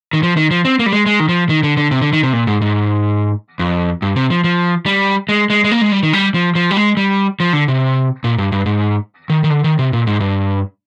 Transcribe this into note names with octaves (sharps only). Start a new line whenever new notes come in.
D#3
F3
D#3
F3
C4
A#3
G3
G#3
G#3
D#3
F3
D#3
D3
D3
C3
D3
D#3
C3
A#2
G#2
G#2
F2
G2
C3
F3
F3
G3
G#3
G#3
G#3
A#3
G#3
G3
D#3
G3
F3
F3
G3
G#3
G3
F3
D3
C3
A#2
G2
G2
G#2
D#3
D#3
D3
D#3
C3
A#2
G#2
G2